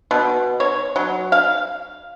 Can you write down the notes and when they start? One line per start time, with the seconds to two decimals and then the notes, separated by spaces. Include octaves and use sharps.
0.11 B2
0.60 C#5
0.96 F#3
1.32 F5